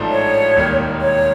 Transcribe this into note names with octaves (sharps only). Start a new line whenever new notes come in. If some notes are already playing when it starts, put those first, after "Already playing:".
Already playing: A1 G#2 F3 A3 D4
C#5
E1 D#2 D#3 G3
C#5